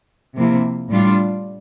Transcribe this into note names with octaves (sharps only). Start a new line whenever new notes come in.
C3 F3 A#3 E4
A2 G3 D4 F4